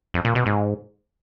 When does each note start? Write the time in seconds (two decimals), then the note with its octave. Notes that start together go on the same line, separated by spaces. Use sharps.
0.14 F2
0.25 A#2
0.35 B2
0.46 G#2